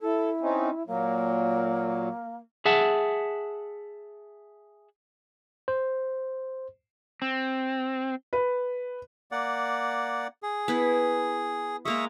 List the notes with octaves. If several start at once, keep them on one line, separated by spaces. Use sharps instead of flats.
E4 A4
C4 C#4 D#4
A#2 F#3 A#3
G#4 E5 F#5 A5
C5
C4
B4
A#3 D5 F#5
G#4
B3 E4 B4
G#3 A#3 A#4 E5 C#6 D#6